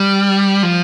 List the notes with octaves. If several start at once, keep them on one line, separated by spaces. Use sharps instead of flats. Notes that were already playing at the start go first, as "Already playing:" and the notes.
Already playing: G3
F3